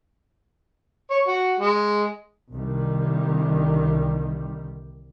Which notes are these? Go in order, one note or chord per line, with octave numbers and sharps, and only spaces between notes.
C#5
F#4
G#3
C2 D3 D#3 G3